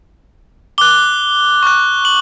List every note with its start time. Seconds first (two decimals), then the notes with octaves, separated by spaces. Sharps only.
0.78 D6 F#6 G7
1.63 C#6 F#6
2.05 F#7